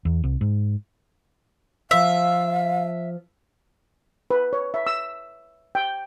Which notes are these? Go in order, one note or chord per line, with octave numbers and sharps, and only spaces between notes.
E2
C2
G#2
F3 C5 E5 F5
B4
C#5
E5
E6
G5